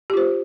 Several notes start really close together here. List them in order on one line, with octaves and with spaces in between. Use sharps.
G4 F4 C5